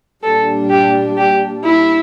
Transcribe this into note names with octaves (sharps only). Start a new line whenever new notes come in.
A#2 G3 D4 A4
G4
G4
E4